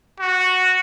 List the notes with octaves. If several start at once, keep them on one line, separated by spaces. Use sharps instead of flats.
F#4